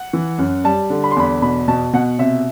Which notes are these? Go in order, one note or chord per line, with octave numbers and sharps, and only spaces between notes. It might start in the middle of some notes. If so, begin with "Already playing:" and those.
Already playing: F#5
E3
F#2
G3 A5
D3
B5
C6
E2 B5
B2 B5
B2 A5
B2 F#5
C3 E5